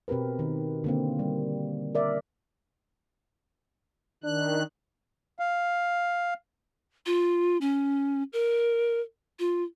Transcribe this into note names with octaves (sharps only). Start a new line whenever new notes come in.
B2 C4 G4 A#4 B4
D#3
D3 A#3 C4
G3
A#4 D5 E5
D#3 D4 F#6
F5
F4
C#4
A#4
F4